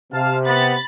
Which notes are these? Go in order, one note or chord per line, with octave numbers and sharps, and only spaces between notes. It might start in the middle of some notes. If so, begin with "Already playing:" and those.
C3 F5 A5
B3 B5 A6